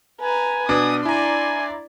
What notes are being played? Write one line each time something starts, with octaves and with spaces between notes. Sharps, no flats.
B4 G#5 A#5
B2 B3 D4 D#6
E4 D5 G#5 A#5 C6